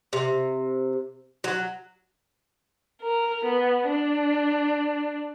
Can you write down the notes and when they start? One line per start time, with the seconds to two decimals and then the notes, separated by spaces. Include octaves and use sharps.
0.13 C3
1.44 F#3
3.00 A#4
3.45 B3
3.88 D4